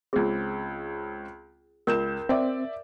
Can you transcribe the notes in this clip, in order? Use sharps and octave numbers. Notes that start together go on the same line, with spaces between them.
C#2 C4 G#4
C#2 A#4 G6 E7
C4 D5 E5